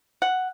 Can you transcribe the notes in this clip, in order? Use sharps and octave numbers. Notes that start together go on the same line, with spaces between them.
F#5